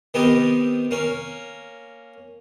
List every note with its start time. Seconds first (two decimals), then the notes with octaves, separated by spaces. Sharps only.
0.14 D#3 B3 C4 D#4 G4
0.91 A#3 C#4